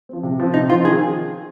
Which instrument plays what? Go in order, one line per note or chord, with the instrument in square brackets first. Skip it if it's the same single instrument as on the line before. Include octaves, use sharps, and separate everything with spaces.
[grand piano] F3 C4
C3
F3 C4
[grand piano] C3 [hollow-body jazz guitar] D#4
[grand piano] F3 C4 [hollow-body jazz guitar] F4
[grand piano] D#3 [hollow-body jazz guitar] G#4